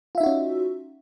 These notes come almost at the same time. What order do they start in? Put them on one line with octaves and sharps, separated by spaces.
F4 E5 D#4 F#4 C#4